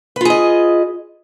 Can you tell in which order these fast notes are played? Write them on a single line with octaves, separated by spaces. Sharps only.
B4 F4 G#4 D#5